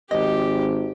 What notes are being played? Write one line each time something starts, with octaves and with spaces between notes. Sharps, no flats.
G#1 G4 D#5